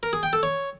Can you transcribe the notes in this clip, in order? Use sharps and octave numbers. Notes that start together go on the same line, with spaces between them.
A#4
G#4
G5
A4
C#5